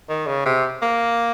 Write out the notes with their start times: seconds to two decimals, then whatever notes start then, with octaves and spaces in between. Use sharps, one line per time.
0.09 D#3
0.27 C#3
0.45 C3
0.82 A#3